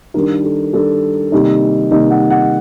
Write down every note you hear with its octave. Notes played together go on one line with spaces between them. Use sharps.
D#3 G3 D4 A#4
A4
D#3 G3 D4 A4
C3 D#3 G3 A#3 D#4
C3 D#3 G3 A#3 D#4 D#5
F#5
F#5